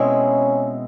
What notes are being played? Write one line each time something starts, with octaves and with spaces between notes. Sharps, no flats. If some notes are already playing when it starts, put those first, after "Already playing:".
Already playing: B2 G#3 C4 C#4 E4 G#4